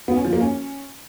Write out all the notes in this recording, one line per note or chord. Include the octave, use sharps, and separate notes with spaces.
B3
C#4
F3
A#3
C#4